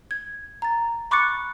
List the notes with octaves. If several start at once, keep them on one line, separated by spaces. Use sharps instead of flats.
G#6
A#5 A6
B5 C#6 D6 F#6 A6 C#7